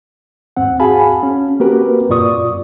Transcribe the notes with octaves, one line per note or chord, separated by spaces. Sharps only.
D#2 G#2 C4 F#5
F#4 G#4 F5 G#5 A5 B5
C#4
A#3 C4 F#4 G4 A#4 B4
F#2 A#2 F4 D5 C#6 D#6